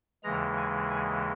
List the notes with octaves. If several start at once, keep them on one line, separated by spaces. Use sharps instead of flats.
D#2 C#3 E3 G#3 A#5
G#5
G#5